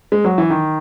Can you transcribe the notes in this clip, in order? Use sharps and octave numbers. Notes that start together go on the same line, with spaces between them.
G#3
F#3
E3
D#3